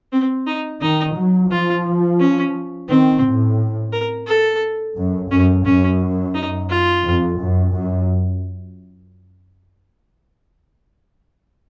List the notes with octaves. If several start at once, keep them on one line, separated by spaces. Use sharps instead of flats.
C4
D#4
D#3 D#4
F#3
F3 F4
C#4
D#3 C4
A2
A#4
A4
F#2
F#2 C#4
F#2 C#4
D#4
F4
F2
F#2
F#2